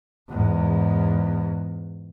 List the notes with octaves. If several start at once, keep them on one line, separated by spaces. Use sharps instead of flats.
E2 G#2